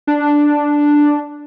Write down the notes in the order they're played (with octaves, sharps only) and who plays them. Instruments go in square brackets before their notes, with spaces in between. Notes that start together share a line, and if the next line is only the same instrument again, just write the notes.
[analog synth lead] D4